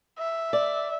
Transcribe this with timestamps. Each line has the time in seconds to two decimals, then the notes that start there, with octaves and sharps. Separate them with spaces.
0.19 E5
0.53 D5